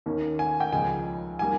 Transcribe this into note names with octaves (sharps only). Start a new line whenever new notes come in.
D#2 D#3 A#3 C#4
G#5
G5
C#2 C#3 F3 G#3 G#5
D#3 G3 A#3 G#5